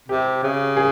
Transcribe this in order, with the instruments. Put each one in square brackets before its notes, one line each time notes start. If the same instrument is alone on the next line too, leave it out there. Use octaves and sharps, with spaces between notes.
[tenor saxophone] C3 [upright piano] G4
[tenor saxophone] C#3
[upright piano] G#4